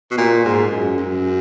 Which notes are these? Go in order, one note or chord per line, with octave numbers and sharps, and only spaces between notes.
B2
A#2
G#2
F#2
F#2